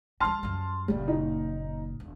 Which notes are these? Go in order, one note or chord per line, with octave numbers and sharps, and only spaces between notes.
F#3 G3 A5 C6 F6
F#2 G3
F#1 A#2 G3
D#4
E1